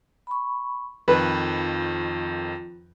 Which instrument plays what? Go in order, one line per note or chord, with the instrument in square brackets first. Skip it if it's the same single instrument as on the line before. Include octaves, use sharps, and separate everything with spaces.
[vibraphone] B5 C#6
[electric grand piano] F2 D#3 F3 [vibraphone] F4 [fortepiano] B4